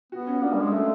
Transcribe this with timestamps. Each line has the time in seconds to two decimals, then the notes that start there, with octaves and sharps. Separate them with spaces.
0.12 B3 F#4
0.27 C#4
0.43 A#3 D4
0.53 G3
0.62 G#3
0.72 A3 C#4